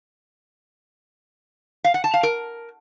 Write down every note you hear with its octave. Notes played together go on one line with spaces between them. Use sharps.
F5
F#5
A5
F5
A#4